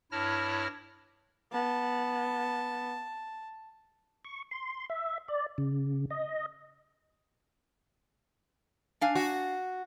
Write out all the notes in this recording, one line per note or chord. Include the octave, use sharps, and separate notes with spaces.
G2 E4 C#5 A5 F6 A#6
B3 A5
C#6
C6
E5
D5
C#3
D#5
D4 F5 G#5
F#4